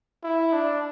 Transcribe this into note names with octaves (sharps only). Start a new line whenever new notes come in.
E4
D4